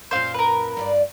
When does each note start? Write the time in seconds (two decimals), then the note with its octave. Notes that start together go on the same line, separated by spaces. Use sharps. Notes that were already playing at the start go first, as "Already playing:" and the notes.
0.11 F#2 A#2 C5 F5
0.34 A#4 B4
0.77 G2 F4 D5